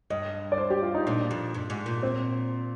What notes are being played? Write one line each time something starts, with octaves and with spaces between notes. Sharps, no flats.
G2 D#5
D5
C5
G4
F4
D#4
A#2 D4
F2
G2
G#2
A#2
C4